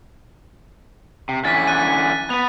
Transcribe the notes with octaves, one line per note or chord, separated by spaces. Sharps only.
C3
D3 E3 C#4 A6 B6
F#6 D#7
B3 B4 F7